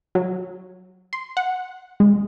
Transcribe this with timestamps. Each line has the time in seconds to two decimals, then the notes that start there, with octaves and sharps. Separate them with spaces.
0.15 F#3
1.13 C6
1.37 F#5
2.00 G#3